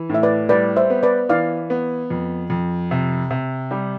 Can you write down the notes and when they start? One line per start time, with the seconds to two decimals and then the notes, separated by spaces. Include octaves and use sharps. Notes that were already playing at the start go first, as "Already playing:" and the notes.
Already playing: E3
0.09 A2 E5
0.23 B4 D5
0.49 G3 B4 D5
0.76 C5 E5
0.90 B3
1.03 B4 D5
1.29 E3 D5 F5
1.70 B3
2.10 F2
2.50 F2
2.91 C3
3.30 C3
3.71 G3